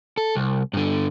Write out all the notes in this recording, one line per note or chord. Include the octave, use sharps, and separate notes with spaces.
A4
C2
G2 D3